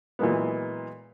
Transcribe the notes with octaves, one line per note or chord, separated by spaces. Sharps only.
A#2 E3 F#3 G#3 A#3 B3